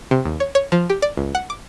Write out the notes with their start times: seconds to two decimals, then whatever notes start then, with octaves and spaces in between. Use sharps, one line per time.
0.11 C3
0.25 D#2
0.40 C#5
0.55 C#5
0.72 F3
0.90 G4
1.02 D5
1.17 C#2
1.35 F#5
1.50 D6